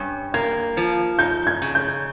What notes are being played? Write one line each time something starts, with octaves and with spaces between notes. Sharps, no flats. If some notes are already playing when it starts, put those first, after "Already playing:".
Already playing: G2 C#4
A#3 G#6
F3
D#4 G6
G#6
C#3
G6